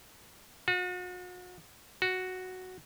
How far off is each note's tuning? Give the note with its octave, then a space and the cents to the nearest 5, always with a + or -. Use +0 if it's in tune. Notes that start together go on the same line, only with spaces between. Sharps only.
F#4 -40
F#4 +0